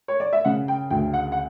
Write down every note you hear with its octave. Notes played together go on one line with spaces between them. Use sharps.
C#5
D5
E5
C#3 F#5
G5
D2 G5
F#5
F#5